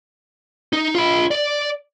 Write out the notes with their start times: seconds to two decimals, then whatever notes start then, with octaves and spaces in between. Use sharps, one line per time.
0.73 D#4
0.95 F4 B5
1.31 D5